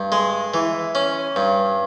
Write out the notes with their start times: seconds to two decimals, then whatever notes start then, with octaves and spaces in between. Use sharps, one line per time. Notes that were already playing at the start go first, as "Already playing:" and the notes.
Already playing: G2
0.12 G#3
0.54 E3
0.95 C#4
1.36 G2